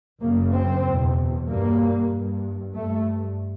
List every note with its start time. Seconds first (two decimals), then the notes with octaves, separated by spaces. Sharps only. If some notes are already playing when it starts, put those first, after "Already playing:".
0.21 F#2 C#3 A#3
0.54 C4
0.84 E2 B2
1.48 G2 A#3
2.11 G2
2.74 G2 A3